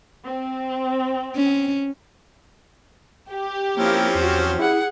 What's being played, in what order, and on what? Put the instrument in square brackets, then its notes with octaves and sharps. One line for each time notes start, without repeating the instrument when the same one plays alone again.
[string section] C4
[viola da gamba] C#4
[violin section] G4
[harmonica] F3 C4 C#4 [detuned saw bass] A#3 [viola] E4 A#4
[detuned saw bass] E2 [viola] F#4 C5
[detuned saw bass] E4 [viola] G#4 F#5